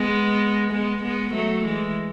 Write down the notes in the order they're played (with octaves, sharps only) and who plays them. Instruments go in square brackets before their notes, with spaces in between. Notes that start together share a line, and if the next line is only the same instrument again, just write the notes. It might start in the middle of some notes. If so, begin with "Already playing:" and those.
Already playing: [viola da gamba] G#3 B3
G#3 B3
G#3 B3
F#3 A3
E3 G#3